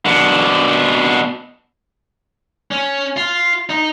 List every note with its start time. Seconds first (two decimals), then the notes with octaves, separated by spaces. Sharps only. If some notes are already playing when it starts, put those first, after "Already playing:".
0.05 B2 D4
2.71 C#4
3.17 F4
3.69 D#4